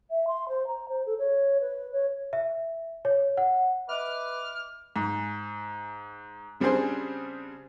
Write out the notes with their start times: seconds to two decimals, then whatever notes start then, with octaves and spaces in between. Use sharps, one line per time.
0.10 E5
0.27 C6
0.49 C5
0.67 A#5
0.89 C5
1.06 A4
1.19 C#5
1.61 B4
1.92 C#5
2.33 E5
3.05 C#5
3.37 F#5
3.89 B4 D#5 E5 D6 F6
4.96 G#2
6.60 C#3 G3 C4 D4 G#4 C5